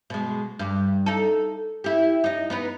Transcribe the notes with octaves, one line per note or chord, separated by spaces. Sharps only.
B2 G#3
G2
D#4 A4
E4 G4
D#4 D#5
B3 D#4 B4